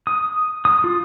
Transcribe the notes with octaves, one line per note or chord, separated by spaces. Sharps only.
D#6
D#6
F4